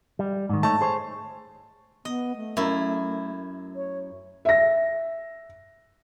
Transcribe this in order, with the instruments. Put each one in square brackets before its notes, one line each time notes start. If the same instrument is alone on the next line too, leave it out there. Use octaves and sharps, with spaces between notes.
[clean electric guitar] G3
G#2 D#3
[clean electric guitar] A3 D#4 C#5 [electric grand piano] A5
[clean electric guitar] G#4 C5 C#5
[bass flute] B3 [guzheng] D#5
[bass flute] A3
[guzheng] F#2 E4
[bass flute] C#5
[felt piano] E5 A#6